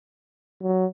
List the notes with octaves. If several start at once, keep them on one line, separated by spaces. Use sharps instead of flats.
F#3